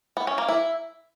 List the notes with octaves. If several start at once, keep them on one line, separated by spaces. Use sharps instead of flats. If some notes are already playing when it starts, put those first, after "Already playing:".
B3
C#4
A#3
E4